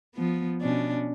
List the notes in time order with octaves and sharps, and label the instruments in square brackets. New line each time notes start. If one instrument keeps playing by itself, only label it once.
[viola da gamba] F3 B3
B2 C#4 D4